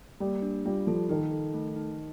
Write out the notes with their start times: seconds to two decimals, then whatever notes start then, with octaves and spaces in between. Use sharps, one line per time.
0.20 G3 A#3
0.42 D4
0.65 G3 F4
0.87 F3 A4
1.09 D#3 D#4
1.32 A4
1.54 A3
1.76 D#4